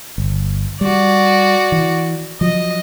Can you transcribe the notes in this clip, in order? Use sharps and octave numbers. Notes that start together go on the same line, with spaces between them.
G1
G3 F#4 D5
E3
F3 F#3 D#5